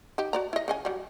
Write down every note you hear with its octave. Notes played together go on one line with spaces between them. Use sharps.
D#4 G4
F#4 D5 A#5
E4 D#5
C#3 D#5 G#5
F#3 G3